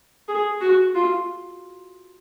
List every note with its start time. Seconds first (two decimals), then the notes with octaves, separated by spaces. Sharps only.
0.28 G#4
0.61 F#4
0.95 F4